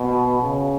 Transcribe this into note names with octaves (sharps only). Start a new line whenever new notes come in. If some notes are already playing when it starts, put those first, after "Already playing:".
Already playing: B2
C#3